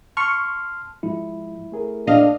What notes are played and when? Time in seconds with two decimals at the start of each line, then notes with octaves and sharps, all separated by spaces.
0.17 A5 C6 C#6 F6
1.03 G#2 F3 G#3 E4
1.72 A3 G#4 A#4
2.07 A#1 D4 D#5 F5